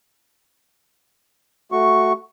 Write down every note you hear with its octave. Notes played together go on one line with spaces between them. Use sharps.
A3 F#4 C#6